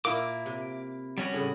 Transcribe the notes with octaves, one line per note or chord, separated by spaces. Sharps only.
A#2 A#3 E4 D6
C3
G3 C#4 F#4 C#5
A2 C#3